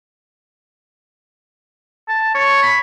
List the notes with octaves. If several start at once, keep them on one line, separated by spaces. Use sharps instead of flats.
A5
C#5
B5